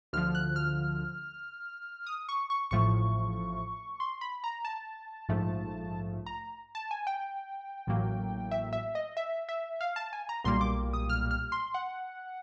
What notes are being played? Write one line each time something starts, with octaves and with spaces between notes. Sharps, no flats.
D2 D3 F3 F6
F#6
F6
D#6
C#6
C#6
A1 A2 F3 A3 C#6
C6
B5
A#5
A5
A#1 G#2 F3 A3
A#5
A5
G#5
G5
A1 A2 F#3 A#3
E5
E5
D#5
E5
E5
F5
A5
G#5
A#5
B1 A#2 G3 A#3 C6
D6
D#6
F6
F6
C6
F#5